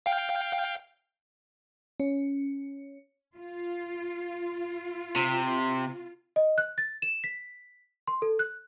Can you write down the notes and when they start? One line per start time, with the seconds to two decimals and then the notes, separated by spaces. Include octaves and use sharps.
0.06 F5 G5
2.00 C#4
3.37 F4
5.16 C3
6.36 D#5
6.58 F#6
6.78 A6
7.02 E7
7.24 B6
8.07 C6
8.22 A4
8.39 F#6